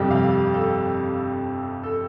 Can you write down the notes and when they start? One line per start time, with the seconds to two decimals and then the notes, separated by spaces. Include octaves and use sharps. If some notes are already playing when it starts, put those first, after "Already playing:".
Already playing: G1 F2 C3 G3 G5
0.11 F5
0.54 A4
1.83 A4